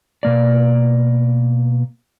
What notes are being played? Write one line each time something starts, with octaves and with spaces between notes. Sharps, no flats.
B2 A#3 D5